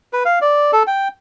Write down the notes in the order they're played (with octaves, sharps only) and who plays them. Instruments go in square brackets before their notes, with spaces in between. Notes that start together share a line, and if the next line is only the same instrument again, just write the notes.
[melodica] B4
F5
D5
A4
G5